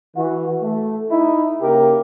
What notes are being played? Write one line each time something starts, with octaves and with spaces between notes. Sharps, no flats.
E3 F#4
A3
D#4 E4
C#3 A#3 G4 A#4